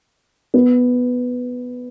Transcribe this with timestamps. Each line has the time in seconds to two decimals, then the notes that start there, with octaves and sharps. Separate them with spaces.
0.54 B3